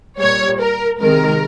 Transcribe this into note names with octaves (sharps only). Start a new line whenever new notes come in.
A#2 G3 C#5
A#4
C3 D#3 G#3 A#4